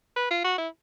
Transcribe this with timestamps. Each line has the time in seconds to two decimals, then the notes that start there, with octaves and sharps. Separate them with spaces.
0.17 B4
0.31 F4
0.45 F#4
0.58 E4